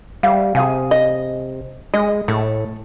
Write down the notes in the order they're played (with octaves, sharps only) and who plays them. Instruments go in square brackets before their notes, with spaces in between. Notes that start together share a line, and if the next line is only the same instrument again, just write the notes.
[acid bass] G3 [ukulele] C5 E5 F5
[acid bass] C3 [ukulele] G#4 F5 G#5
[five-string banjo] D#5
[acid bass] G#3 [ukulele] G#4 [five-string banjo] D#5
[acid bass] A2 [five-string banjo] A3